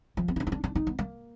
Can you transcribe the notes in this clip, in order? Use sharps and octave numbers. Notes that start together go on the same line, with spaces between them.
F3
B3
D#4
D4
D#4
D4
D4
D#4
B3
A#3